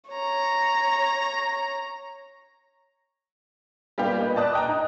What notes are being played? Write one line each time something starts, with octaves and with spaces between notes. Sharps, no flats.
C#5 A#5
G3 A#3 B3 F4 G4
B4 D#5
D5 A5 D#6 F#6
D#5 G5 A#5
D#4